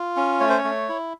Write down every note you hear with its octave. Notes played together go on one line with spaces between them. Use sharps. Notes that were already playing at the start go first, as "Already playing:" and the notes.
Already playing: F4
C#4
A3 C#5
C5
C#5
A3
E4